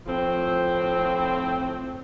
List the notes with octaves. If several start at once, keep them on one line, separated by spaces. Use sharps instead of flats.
A2 F3 C4